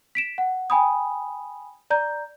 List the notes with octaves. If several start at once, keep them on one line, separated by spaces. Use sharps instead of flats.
B6 D7 E7
F#5
G5 G#5 B5 D#6
D5 A#5 G6